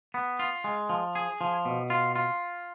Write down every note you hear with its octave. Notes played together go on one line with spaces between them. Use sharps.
B3
F4
G#3
F3
G#4
F3
B2
F4
F4